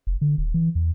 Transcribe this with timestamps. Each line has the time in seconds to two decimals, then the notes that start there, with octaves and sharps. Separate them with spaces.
0.07 F1
0.21 D3
0.38 D#1
0.54 E3
0.75 E2